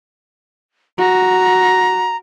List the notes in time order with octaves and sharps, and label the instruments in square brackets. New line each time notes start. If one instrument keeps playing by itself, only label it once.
[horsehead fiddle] F#4 [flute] A#5